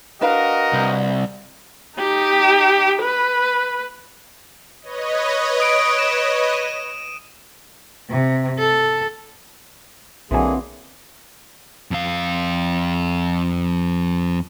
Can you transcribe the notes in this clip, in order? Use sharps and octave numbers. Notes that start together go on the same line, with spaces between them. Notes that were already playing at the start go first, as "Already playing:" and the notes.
D4 F#4 A#4 B4 D#5 F5
C2
D#4 G4
B4
B4 C#5 D#5
D#6 D7
E7
D#7
C3
A4
B1 D3 E3 F#3 A#3 C4 G#4 G#5
F2 F5